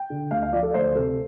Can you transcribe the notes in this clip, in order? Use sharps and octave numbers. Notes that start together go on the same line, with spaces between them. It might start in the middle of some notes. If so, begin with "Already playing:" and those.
Already playing: G5
D3
D2 F5
F5
F3 D5
A4
D2 C5
C3 A4